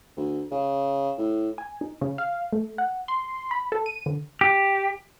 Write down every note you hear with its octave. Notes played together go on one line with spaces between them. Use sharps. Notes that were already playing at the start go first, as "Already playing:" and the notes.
D2
C#3
A2
G#5
D#4
C#3
F5
A3
F#5
C6
B5
A4
D#7
D3
G4